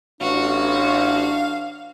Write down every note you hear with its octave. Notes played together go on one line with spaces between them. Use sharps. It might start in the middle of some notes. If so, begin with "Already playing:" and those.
A1 D4 F#4 F5